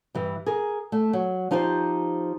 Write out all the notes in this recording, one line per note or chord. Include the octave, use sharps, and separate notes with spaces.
G2 E3
G#4 A#4
A3
F#3
F3 D#4 F4 G4 C5